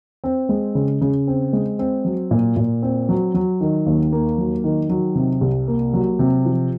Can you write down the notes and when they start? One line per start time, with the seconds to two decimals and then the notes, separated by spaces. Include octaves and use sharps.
0.24 C4
0.49 G#3
0.75 C#3
1.01 C#3
1.27 C4
1.53 G#3
1.79 C4
2.05 F#3
2.31 A#2
2.56 A#2
2.82 C4
3.09 F#3
3.34 F#3
3.61 D#3
3.86 D#2
4.13 A#3
4.38 F#3
4.64 D#3
4.90 F#3
5.15 C3
5.41 C2
5.68 A#3
5.93 F#3
6.19 C3
6.45 F3